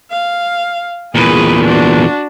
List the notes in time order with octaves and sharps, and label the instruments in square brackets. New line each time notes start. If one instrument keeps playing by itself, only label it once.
[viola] F5
[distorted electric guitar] E2 A#2 [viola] G#4 B4
[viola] D4 F#4